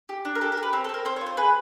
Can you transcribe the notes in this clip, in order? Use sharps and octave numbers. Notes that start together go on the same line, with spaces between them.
G4
D4
A#4
G4 A4
A#4
G4
B4
C4 A#4
A4
C4 A#4
C4 C5
C#5
F4
C5
G#4 B4